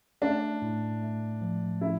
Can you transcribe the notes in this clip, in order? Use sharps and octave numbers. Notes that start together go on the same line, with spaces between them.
A3 D4
A2
A3
F3
F3 E4